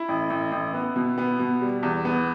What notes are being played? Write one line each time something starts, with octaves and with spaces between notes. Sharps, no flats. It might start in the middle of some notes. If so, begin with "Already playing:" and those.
Already playing: E4
A1
A1
A1
B3
B2
B3
B2
G3
E2
B3